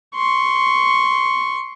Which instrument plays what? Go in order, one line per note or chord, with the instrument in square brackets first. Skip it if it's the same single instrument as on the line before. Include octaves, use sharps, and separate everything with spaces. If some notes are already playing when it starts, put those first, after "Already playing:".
[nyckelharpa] C6 C#6